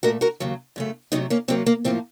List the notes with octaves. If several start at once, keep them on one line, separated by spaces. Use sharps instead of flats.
A#2 A3 F#4 A#4
F#4 A#4
D#2 C#3 F#3
F#2 C#3 A3
C3 F#3 A3 C4 D#4
A#3 C#4
C3 F#3 A#3 C4
A#3
A2 F3 A#3 C4